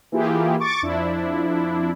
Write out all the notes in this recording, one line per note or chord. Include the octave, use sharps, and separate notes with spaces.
E3 A#3 E4 F4 G4 G#4
C#6 D6 A6
F2 F3 D4 E4